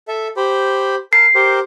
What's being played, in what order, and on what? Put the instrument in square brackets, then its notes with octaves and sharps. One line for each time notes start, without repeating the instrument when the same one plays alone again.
[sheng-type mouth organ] A4 E5
G4 C5 B5
[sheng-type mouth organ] A#4 A5 [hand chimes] C7
[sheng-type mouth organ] G4 A#4 C5